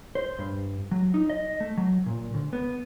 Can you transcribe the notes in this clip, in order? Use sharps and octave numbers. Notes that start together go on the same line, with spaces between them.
C5
G2
F#3
D#4
D#5
A3
F#3
A#2
D2
B3